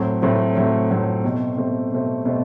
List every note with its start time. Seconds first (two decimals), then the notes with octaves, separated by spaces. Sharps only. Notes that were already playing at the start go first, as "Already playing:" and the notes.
Already playing: A2 F#3 A3 C4
0.22 A2 F#3 A3 C4
0.56 A2 F#3 A3 C4
0.90 A2 F#3 A3 C4
1.24 B2 A3 C4
1.57 B2 A3 C4
1.92 B2 A3 C4
2.25 B2 A3 C4